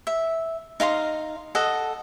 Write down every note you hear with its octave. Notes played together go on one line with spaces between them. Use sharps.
E5
D#4 F5 A#5 C6
A4 D#5 F#5